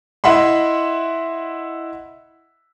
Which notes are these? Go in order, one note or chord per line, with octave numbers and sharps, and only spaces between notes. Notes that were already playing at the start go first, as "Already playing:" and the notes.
E4 D#5 E5 F#5 B5 C6